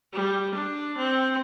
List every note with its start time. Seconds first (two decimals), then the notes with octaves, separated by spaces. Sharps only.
0.13 G3
0.55 D4
0.98 C4